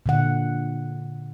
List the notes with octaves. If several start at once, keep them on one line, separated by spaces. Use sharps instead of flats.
A#2 D3 F#5